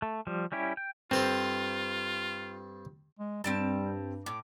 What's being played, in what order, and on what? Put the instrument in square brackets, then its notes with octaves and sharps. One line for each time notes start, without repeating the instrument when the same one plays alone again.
[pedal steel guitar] A3
F3 G3
G3 C#4 E4 G4
G5
[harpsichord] G2 A4 C5 [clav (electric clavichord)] C4 [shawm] F4
[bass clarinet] G#3
[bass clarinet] G2 [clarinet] G3 [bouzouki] C4 G4 A5
[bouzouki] A2 [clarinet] D6